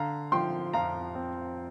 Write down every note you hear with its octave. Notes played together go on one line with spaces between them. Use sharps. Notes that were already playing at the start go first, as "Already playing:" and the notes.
Already playing: D3 F5 A#5
F3 G5 C6
F2 F5 A#5
C4